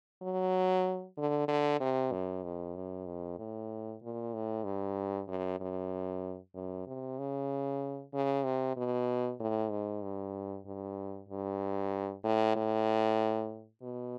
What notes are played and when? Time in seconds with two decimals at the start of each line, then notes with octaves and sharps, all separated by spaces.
0.22 F#3
1.18 D3
1.48 D3
1.80 C3
2.12 F#2
2.44 F2
2.76 F#2
3.06 F2
3.39 A2
4.02 A#2
4.34 A2
4.65 G2
5.28 F#2
5.60 F#2
6.55 F#2
6.87 C3
7.19 C#3
8.14 C#3
8.44 C3
8.77 B2
9.40 A2
9.71 G#2
10.02 G2
10.66 G2
11.29 G2
12.24 A2
12.56 A2
13.82 B2